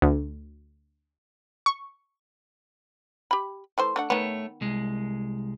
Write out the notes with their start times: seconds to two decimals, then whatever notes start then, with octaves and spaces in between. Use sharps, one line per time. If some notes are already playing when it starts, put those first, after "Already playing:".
0.02 D2
1.66 C#6
3.31 G4 B5
3.78 E3 A3 C5
3.96 A3 D4 F#5
4.10 D#3 A3 B3 C#5
4.61 C2 G#3